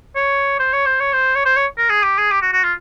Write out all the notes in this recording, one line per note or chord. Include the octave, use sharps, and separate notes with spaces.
C#5
C5
C#5
C5
C#5
C5
C#5
C5
C#5
A#4
G#4
G4
G#4
G4
F#4
F#4
F4